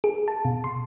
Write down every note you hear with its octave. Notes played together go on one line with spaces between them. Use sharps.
G#4
A5
B2
C6